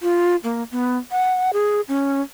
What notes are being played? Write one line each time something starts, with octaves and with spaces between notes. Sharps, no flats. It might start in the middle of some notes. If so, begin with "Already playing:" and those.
F4
A#3
B3
F#5
G#4
C#4